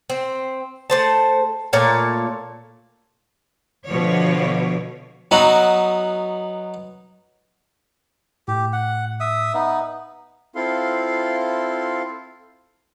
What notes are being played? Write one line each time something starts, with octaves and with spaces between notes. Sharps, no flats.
C4
A3 C5 A5
A#2 A3 C#5 F5
B2 D3 F3 C#5
F#3 B3 D#4 F#4
A2 G4
F#5
E5 D#6
B3 D#4 E5
C4 E4 F4 A4 F5 C6